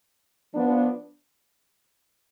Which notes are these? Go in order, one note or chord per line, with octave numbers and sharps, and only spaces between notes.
F3 B3 D4